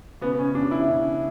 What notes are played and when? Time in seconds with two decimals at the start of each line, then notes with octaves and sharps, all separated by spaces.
0.21 C#3 B3
0.39 C#4
0.54 C#3 D4
0.71 E4
0.87 C#3